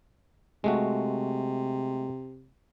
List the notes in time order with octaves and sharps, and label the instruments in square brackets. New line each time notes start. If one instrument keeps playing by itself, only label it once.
[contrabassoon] C3 [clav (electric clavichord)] G#3 A3 F#4